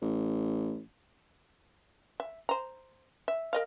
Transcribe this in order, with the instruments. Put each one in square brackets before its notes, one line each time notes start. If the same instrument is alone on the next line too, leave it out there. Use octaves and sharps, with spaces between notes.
[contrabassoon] A1
[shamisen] E5
C5 A#5
E5
A#4 D#5 F5